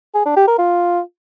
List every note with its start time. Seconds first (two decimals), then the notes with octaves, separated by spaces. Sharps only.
0.14 G#4
0.25 D4
0.36 G4
0.47 A#4
0.58 F4